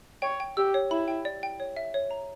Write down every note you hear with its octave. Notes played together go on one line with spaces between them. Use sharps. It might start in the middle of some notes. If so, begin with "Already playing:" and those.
C#5 G5
G5
G4 E6
C#5
E4 B5
G5
D5
G5
C#5
E5
C#5
A#5